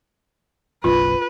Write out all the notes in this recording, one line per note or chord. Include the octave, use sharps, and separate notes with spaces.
F#1 B1 F4 B4